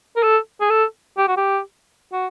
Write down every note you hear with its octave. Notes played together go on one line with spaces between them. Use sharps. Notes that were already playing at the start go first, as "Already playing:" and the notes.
A#4
A4
G#4
A4
G4
F#4
G4
F#4